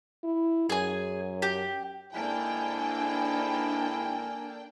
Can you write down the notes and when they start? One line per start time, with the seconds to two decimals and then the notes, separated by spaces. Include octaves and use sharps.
0.24 E4
0.70 F#2 G#4 G#5
1.42 G4
2.14 G#2 A#3 D4 E4 A4 G5 G#5